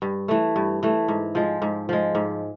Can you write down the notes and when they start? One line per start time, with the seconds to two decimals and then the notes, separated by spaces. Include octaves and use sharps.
0.02 G2
0.28 E3 A3
0.56 G2
0.83 E3 A3
1.08 G#2
1.35 F3 G#3
1.62 G#2
1.89 F3 G#3
2.15 G#2